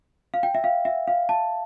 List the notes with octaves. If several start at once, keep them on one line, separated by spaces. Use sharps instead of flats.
F5
G5
E5
F5
E5
F5
A5